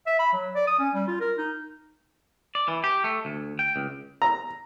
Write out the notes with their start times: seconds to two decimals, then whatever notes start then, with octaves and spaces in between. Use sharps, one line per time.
0.07 E5
0.19 B5
0.33 F#3
0.55 D5
0.67 D#6
0.79 C#4
0.94 G3
1.08 F4
1.21 A#4
1.37 D#4
2.55 D5
2.68 E3
2.84 G4
3.04 A3
3.25 D2
3.59 G5
3.76 C#2
4.22 A#5